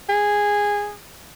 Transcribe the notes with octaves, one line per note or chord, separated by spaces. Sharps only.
G#4